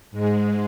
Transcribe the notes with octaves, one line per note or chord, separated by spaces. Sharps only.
G#2 G#3